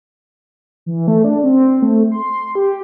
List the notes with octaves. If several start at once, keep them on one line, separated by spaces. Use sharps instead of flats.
E3
A3
D4
C4
A3
C6
G4